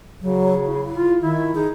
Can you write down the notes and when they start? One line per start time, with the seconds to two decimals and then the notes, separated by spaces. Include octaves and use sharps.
0.22 C#3 F#3
0.67 E4
0.94 F4
1.22 D#3 E4
1.55 D#4 G#4